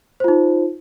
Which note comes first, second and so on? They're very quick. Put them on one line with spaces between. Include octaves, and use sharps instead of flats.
C5 F4 D#4